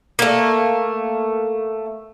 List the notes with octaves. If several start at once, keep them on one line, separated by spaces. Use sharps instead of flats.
A3 A#3